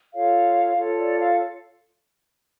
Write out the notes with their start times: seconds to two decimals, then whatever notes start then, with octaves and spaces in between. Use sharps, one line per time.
0.14 F4 A4 C#5 F5
0.77 F4 A4 C#5
0.99 D5
1.20 F5